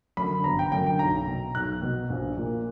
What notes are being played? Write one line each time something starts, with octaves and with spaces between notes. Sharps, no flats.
F#2 D3 B5
G1 A#5
G5
F#2 D3 G5
G5
B1 A#5
B2
B1 F#6
B2
A#1
A#2